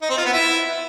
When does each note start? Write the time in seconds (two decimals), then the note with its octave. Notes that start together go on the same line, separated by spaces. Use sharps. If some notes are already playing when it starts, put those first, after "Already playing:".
0.02 D#4
0.10 C4
0.17 F4
0.25 B3
0.33 E4